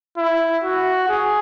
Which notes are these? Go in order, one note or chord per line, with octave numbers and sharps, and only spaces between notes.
E4
F#4
G#4